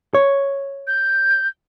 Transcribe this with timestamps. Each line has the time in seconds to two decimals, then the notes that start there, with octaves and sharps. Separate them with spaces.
0.14 C#5
0.87 G6